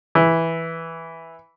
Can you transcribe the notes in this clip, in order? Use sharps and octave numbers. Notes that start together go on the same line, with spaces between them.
E3